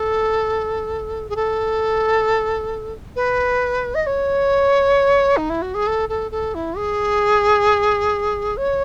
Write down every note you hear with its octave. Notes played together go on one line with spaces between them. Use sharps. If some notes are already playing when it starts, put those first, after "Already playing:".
Already playing: A4
G#4
A4
B4
D#5
C#5
D#4
E4
F#4
G#4
A4
A4
A4
E4
G#4
C#5